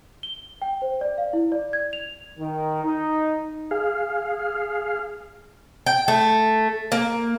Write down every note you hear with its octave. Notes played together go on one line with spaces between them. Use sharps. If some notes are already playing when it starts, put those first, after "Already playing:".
G7
G5
C5
D5
F5
E4
D5
G#6
F7
D#3
D#4
G#4 F5
G5
A3
A#3